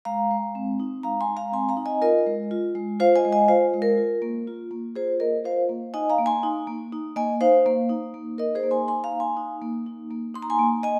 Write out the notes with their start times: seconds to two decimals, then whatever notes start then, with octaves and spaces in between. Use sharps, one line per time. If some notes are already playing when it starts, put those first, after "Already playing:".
0.05 G#3 F5 A#5
0.31 G#3
0.55 C4
0.80 D#4
1.03 G#3 F5 A#5
1.21 G#5 C6
1.29 G#3
1.37 F5 A#5
1.52 C4 G#5 C6
1.69 F5 A#5
1.77 D#4
1.86 D#5 G#5
2.02 F4 A#4 D#5
2.26 G#3
2.51 F4
2.75 G#3
3.00 F4 C5 F5
3.16 D#5 G#5
3.25 G#3
3.32 D#5 G#5
3.48 F4 C5 F5
3.74 G#3
3.82 A#4
3.98 F4
4.22 A#3
4.47 F4
4.71 A#3
4.96 F4 G#4 C5
5.20 A#3 A#4 D#5
5.44 F4 C5 F5
5.69 A#3
5.94 D#4 D#5 G#5
6.10 F5 A#5
6.18 A#3
6.26 G#5 C6
6.43 D#4
6.67 A#3
6.92 D#4
7.16 A#3 D#5 G#5
7.41 D#4 C5 F5
7.66 A#3
7.89 D#4
8.14 A#3
8.38 D#4 A#4 D#5
8.55 G#4 C5
8.63 A#3
8.71 G#5 C6
8.87 D#4 G#5 C6
9.04 F5 A#5
9.12 A#3
9.20 G#5 C6
9.37 D#4
9.62 A#3
9.86 D#4
10.11 A#3
10.34 D#4 C6
10.42 A#5
10.50 G#5 C6
10.59 A#3
10.83 D#5 G#5